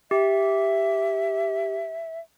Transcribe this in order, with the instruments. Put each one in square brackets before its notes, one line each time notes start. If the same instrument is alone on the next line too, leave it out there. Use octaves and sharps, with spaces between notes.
[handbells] G4 [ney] E5